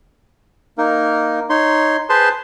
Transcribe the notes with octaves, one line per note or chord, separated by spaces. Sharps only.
A#3 D#4 A#4
D#4 C#5 C6
G#4 B4 C5 A5 C6